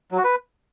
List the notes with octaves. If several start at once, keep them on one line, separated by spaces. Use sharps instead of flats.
F#3
F#4
B4